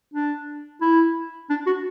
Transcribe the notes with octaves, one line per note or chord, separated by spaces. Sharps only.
D4
E4
D4
F#4